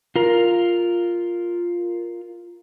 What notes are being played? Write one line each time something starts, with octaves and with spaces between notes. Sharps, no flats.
F4 A#4